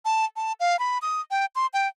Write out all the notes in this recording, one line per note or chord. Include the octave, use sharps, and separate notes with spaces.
A5
A5
F5
B5
D#6
G5
C6
G5